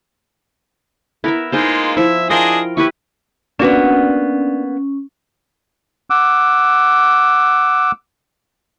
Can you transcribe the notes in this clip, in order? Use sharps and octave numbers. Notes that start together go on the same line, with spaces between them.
B3 E4 A#4 E5
G#3 A#3 D#4 F4 G#4 C5
F3 E4 E5
D4 F4 G#4 A#4 D#5 G5
E4 G4 B4 C#6
A#3 B3 C#4 D4 F#4
F#5 D6 E6